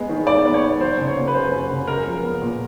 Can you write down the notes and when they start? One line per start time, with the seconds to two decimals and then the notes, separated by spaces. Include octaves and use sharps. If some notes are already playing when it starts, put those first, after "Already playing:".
Already playing: G#3 B3
0.09 D#3
0.27 D#3 D5
0.45 B3
0.54 C#5
0.63 G#3
0.81 F#3 C5
0.98 C#3
1.07 C#5
1.16 A#3
1.28 B4
1.34 F#2 C5
1.53 F#3
1.70 C#3
1.87 G#3 A#4
2.05 F3
2.23 B3
2.42 A#2